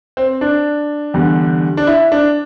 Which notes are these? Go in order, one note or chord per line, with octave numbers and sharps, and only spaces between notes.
C4
D4
E2 D3 G3
D4
E4
D4